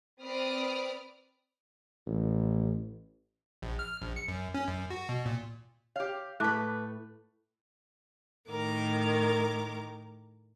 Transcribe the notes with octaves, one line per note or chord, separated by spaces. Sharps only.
C4 B4 D5 D#6 F6 D7
A1
A#1
F6
A#1
C#7
F#2
C#4
F#2
F#4
B2
A#2
G4 C#5 F5
A2 A3 B4 A5 D6 F#6
A2 D#3 A#4 D6